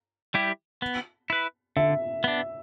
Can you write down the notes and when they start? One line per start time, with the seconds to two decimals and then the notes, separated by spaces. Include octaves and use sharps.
0.34 G3 E4 G4
0.82 B3
1.30 E4 B4
1.77 D3 E5
2.24 B3 D4